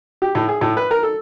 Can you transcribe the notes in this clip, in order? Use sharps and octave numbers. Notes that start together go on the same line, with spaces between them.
G4
A2
G#4
A2
B4
A#4
A4